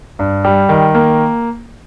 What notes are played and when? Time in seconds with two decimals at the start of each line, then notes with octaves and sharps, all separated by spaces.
0.19 G2
0.45 G3
0.69 D#3
0.95 A#3